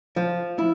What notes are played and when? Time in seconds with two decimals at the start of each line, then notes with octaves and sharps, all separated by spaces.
0.16 F3
0.59 E4